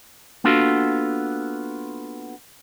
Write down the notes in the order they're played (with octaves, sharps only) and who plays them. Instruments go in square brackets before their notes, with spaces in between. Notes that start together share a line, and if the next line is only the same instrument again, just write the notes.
[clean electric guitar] A#3 B3 D4 F4 F#4 A4